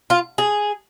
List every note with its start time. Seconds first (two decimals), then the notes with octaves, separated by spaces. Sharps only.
0.10 F4
0.38 G#4